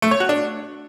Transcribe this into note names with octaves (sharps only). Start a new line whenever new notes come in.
A3
C#5
F#4
D4